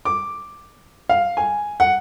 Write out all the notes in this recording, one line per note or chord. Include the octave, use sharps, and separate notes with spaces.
D6
F5
G#5
F#5